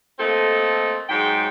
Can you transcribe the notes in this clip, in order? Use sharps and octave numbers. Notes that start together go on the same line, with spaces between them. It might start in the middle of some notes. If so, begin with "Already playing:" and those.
A3 A#3 C4 A4 D#5
G#2 F#3 G#3 G5